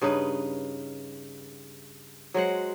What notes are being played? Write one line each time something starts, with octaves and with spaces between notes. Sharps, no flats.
G2 C#3 D#4 B4
F#3 G#3 C5 F#5